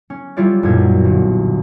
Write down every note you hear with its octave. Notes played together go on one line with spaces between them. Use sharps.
C#4
G3 E4 F4 C#5 D5
B1 F#2 A#2 G#6
G1